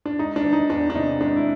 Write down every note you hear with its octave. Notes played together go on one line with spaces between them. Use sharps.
D4
G#3 D#4
D4
E3
D#4
E2 D4
D4
C3 D#4
G#3 D4
E4